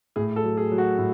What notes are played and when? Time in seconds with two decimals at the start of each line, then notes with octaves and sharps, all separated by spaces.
0.16 A2 G#4
0.36 A4
0.44 F#3
0.57 G#4
0.72 F#3
0.78 F#4
0.98 A2